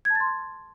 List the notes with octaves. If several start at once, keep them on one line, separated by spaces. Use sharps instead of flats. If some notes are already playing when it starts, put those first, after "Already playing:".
G#6
A5
A6
C6